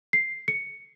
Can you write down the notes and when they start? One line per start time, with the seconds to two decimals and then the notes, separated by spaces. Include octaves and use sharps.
0.13 C7
0.48 C#7